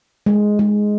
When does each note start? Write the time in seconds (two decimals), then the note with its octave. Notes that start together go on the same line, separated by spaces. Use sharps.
0.26 G#3
0.59 G#3